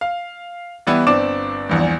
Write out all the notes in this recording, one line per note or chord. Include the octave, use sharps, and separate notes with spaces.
F5
E3 G3 B3 E4
G1 C4 D4 D6 E7
A#1 E2 G2